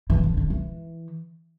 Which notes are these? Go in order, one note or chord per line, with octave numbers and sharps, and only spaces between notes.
E3
D3
D3
E3